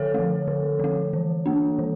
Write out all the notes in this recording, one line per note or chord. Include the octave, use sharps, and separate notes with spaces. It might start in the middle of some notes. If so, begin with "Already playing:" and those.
Already playing: D3 A4 C#5
F3 A3
D3
F3 A3
E3
A#3 D4
E3